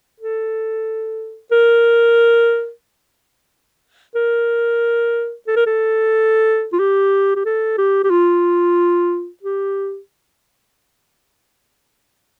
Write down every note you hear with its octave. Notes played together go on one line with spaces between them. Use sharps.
A4
A#4
A#4
A4
A#4
A4
F4
G4
G4
A4
G4
G4
F4
G4